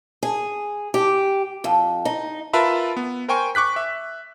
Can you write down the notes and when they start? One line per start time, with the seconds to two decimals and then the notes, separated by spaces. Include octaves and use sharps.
0.23 G#4
0.94 G4
1.64 F2
2.05 D#4
2.53 F4 A#4 B4 E5 A5 B5
2.97 B3
3.29 A#4 C5 G5 G#5 C#6
3.55 C#6 D6 F#6 B6
3.76 E5